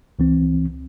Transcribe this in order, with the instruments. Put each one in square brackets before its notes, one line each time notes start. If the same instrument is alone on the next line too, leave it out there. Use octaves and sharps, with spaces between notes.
[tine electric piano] C#2 E3 C4